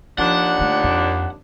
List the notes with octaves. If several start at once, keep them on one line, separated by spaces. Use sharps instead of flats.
D#2 A#2 F3 D4 F#5
D3 A3
F2